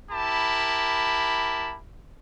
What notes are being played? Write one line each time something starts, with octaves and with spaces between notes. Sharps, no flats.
E4 G4 A#4 A5 B5